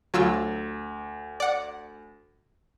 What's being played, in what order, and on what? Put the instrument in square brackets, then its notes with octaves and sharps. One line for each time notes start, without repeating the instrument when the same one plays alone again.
[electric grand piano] D2 [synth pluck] F#3 F4 E6
[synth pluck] D5 F#5